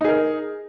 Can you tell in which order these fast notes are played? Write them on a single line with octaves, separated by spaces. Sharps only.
D#4 G#4 A#4